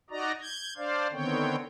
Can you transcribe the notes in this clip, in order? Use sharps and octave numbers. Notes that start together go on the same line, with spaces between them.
D#4 F#4 D5 D#5 A#5
G6 G#6
D4 C5 D5 F5
D3 D#3 B3 C4 C#5 G5